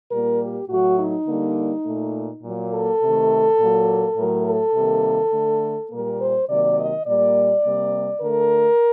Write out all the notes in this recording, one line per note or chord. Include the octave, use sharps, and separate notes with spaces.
A#2 G3 A#3 A#4
G4
A2 F#3 A3 F#4
D#4
D3 G3 A#3
A#2 A3
A#2 F#3 A#3
A4
C3 D#3 A3
A#2 F#3 A#3
A2 F#3 A3 A#4
A4
C3 D#3 G3 A#3
D3 A3
A#2 G3 A#3 A#4
C5
C3 D#3 F#3 A#3 D5
D#5
A#2 G3 A#3 D5
C3 G3 A#3
D3 A3 A#4